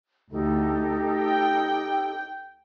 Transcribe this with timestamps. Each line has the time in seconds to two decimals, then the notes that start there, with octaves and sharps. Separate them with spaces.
0.32 D2 D#4 G4 A4
1.20 G5